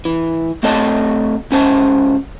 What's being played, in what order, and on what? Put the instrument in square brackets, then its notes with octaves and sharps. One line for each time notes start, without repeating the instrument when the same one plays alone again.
[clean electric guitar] E3
A3 C4 A4 C#5 D#5 A5
C#2 C#4 C5 A5